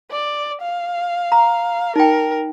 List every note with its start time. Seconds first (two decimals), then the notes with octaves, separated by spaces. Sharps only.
0.11 D5
0.61 F5
1.32 A#5
1.96 D#4 A#4 G5